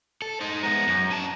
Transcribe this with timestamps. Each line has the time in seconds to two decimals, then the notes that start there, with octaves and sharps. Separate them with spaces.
0.22 A4
0.41 D#4 C5
0.63 G#3 B3 A#5
0.87 F#2
1.11 C#4 A5